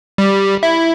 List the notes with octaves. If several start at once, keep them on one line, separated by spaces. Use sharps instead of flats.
G3
E4